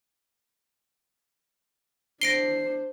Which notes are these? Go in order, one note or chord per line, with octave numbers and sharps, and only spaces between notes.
D4 C5 A#6 C7 D7 G7